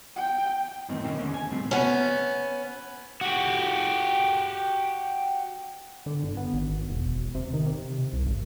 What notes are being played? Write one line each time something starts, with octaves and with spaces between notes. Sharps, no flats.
G5
F#2 A2 D#3 E3 C4
D#3 A#3 C4 C#4 D#4
E2 D3 C#4
G#5
A2 F3 G3 C4
B3 C#4
F#4 G4
D3
G1
B3
G#1
E1
C3
D#3
C3
C2
G#1